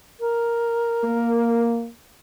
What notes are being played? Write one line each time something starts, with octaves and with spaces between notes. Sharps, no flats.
A#4
A#3